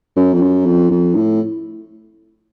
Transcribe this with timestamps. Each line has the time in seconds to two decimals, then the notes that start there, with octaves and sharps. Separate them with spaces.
0.16 F#2
0.33 F2
0.42 F#2
0.66 F2
0.91 F2
1.15 A2